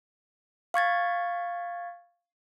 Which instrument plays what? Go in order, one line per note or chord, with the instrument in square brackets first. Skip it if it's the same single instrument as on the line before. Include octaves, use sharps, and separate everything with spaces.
[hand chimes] F5 C#6 G#6 A6